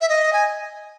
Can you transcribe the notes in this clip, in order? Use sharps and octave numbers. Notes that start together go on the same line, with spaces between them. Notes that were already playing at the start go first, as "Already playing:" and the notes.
E5
D#5
G#5